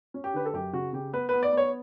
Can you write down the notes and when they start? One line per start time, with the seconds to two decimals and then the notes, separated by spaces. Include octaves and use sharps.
0.14 C#4
0.24 G4
0.34 D3 B4
0.46 A4
0.53 F#2 G4
0.73 C#3 F#4
0.93 C#3 G4
1.13 B3 B4
1.29 B3 B4
1.43 D5
1.52 B3 C#5